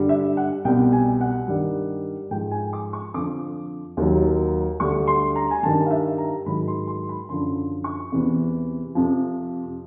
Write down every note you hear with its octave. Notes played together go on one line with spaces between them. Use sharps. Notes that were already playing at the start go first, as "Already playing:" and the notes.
Already playing: G2 D3 G3
E5
F#5
C2 B2 G3 G5
G#5
F#5
G2 D#3 G3
G#2 F3 G5
G#5
D6
C#6
F2 D3 F3 D6
D#2 D#3 F#3
D2 D3 G3 C#6
C6
A#5
G#5
G2 D#3 G3 A5
F5
E5
A#5
G#2 D#3 F#3 B5
C6
C6
B5
F#2 D3 F3 C6
C#6
E2 C3 E3
F2 C3 F3